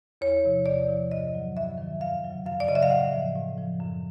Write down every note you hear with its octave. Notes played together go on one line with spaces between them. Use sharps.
E2 C#5
C3 F3
E2 D5
C3 F3
G2 D#5
D#3 F#3
G2 E5
D#3 F#3
F#2 F5
C#3 F#3
F#2 F5
D5
C#3 F#3 D#5 E5
F5
A2 F#5
F3
A2
F3
F#2